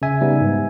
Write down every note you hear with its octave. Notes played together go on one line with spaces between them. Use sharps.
C#3 E5 G#5
G3 B3 D#4
G#2